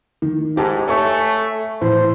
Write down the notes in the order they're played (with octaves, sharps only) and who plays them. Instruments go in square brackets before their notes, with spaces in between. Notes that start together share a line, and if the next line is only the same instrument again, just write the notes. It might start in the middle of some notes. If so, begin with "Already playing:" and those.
[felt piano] D#3
[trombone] G#2 [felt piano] G4 A5
[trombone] A3 [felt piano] C#5 G#5 C#6
[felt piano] A2 E3 [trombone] C5